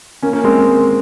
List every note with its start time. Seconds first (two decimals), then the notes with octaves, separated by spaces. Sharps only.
0.22 A#3 C#4
0.33 A#3 C#4
0.44 G#3 C4